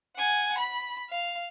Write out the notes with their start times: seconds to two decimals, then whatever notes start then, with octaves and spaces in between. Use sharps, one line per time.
0.16 F#5 G#5
0.58 B5
1.10 F5